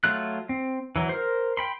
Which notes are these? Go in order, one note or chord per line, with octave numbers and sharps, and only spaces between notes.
F#3 A3 F4 F#6
C4
E3 F#3
A#4 C5
G5 B5 C6